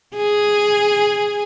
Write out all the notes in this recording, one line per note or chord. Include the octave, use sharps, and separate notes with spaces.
G#4